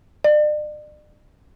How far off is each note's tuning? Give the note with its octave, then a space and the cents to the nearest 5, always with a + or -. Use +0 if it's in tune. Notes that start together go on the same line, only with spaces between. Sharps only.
D5 +40